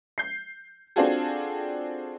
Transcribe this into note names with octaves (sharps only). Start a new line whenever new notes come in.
G6 C7
C4 D4 F4 F#4 G#4 A4